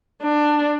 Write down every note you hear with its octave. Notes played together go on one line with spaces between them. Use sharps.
D4